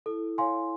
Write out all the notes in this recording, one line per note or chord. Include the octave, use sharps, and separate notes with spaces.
E4 A4
C#5 F5 G#5 C6